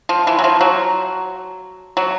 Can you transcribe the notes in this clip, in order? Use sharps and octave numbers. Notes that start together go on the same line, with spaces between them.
F3
E3
F#3
F3
F#3
F#3